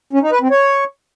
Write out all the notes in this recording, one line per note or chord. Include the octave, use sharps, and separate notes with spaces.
C#4
D#4
B4
C4
C#5